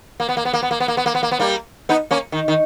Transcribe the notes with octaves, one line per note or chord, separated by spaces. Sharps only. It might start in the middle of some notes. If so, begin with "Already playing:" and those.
A#3
B3
A#3
B3
A#3
B3
A#3
B3
A#3
B3
A#3
B3
A#3
B3
G3 A#3
B3 D#4
A#3 C#4
D#3
D#3